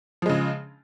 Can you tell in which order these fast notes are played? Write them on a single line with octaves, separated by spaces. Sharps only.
F3 G#3 C#3